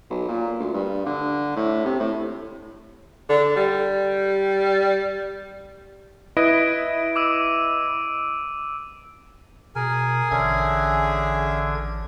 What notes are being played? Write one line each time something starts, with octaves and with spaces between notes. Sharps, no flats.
B1
A#2
D2
G2
D3
A2
C3
A2
D3
G3
E4 B4 D#5 D7
D6 E6 D#7
B2 G#4 A#4 G#5
A1 D3 C#4 D4 E5 G#6